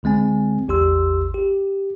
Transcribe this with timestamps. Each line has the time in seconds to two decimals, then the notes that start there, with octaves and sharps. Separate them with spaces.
0.03 C#2 D3 G#3 C4 G#5
0.68 A1 E2 G4 C6 E6
1.34 G4